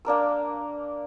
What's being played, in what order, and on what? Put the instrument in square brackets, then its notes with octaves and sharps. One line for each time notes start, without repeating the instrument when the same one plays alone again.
[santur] A#3 D4 A#4 E6